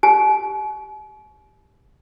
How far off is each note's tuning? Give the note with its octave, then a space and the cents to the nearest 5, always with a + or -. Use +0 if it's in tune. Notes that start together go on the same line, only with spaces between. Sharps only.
G4 +0 G#5 +45